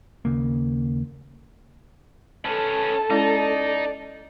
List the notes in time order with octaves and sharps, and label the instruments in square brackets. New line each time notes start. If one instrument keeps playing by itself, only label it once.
[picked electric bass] D#2 C#3 A#3
[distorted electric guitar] C#4 B4 [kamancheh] A4 A5
[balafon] G#3 C#4 E4 [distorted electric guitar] D#4 [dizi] D5